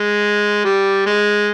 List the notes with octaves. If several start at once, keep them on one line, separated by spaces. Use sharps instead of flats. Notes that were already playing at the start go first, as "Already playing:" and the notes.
Already playing: G#3
G3
G#3